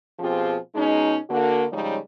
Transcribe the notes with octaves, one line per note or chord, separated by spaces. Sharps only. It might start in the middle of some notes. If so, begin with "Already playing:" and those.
B2 F3 C4 F4 G4 G#4
B2 G#3 C#4 D#4
D3 A#3 F#4
C#3 F3 G3 G#3 D#4 C#5